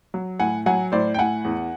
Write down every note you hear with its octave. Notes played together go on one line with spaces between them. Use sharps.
F#3
A2 F#5 G#5
F#3 F#5 G#5
A2 C5 D5
G5
A2 F#5 G#5
E2